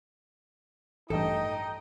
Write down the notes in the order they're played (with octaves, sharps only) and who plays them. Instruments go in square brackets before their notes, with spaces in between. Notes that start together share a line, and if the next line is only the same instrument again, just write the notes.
[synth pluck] A1 G2 [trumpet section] D#4 [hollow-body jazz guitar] A4 [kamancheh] D#5 G5